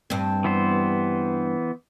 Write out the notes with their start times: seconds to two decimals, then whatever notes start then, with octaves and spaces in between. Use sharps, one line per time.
0.10 G2 C4
0.44 E3 B3 C5